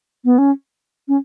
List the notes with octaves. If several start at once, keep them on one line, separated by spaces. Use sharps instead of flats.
B3
C#4
C#4